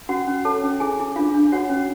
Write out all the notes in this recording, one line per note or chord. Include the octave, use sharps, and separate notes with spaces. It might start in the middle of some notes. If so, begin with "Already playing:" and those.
C#4 F#4 F#5
C#4
A4 C#5 A5
C#4
E4 G#4 G#5
E4
D4 F4 F5
D4
F#4 C#5 F#5
C#4